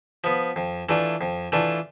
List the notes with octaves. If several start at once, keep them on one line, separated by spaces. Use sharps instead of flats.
F3 B3
F2
E3 A3 D4 F4
F2
E3 A3 D4 F4